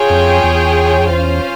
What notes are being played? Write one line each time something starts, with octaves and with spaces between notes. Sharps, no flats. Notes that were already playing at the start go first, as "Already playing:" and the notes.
Already playing: F4 G#4 C#5 G5
F2
E2
F2
E2 C#4 F4 C5 F5